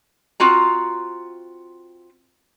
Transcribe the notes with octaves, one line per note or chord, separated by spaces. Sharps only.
C4 F4 F#4 A#5